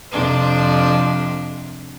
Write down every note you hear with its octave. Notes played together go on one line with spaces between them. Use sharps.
F2 C3 D4